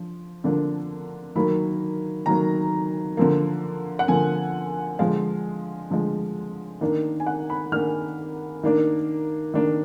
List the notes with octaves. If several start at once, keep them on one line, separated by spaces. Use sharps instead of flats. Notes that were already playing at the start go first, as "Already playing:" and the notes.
Already playing: F3 D4
D3 F3 A#3 D4
D#3 F#3 A#3 B5
D#3 F#3 A#3 A#5
D3 F3 A#3
F#5
D3 F3 A#3 G#5
D3 F3 G#3 F5
D3 F3 G#3
D#3 A#3 D4
G#5
F#5
B5
D#3 A#3 D4 F6
D#3 A#3 D4
D#3 A#3 D4